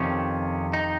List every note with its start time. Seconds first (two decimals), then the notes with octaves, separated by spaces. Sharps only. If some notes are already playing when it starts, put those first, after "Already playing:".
Already playing: F2 C3 D#3 C#4
0.73 D#4